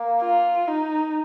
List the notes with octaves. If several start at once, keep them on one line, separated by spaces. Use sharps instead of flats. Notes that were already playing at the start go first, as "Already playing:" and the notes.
Already playing: A#3
F4
D#4